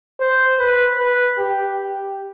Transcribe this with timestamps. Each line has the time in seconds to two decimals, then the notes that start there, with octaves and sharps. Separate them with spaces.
0.20 C5
0.59 B4
0.98 B4
1.37 G4
1.78 G4